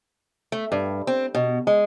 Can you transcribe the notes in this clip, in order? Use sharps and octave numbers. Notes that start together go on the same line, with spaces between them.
A3
G2
C4
B2
G#3